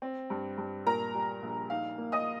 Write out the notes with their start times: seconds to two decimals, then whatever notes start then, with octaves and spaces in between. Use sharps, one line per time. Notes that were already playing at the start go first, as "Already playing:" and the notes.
0.02 C4
0.30 G2
0.58 G2
0.86 A#2 A#4 A#5
1.15 G3
1.42 A#1
1.70 D#4 F5
1.98 A#3
2.12 D#5 D#6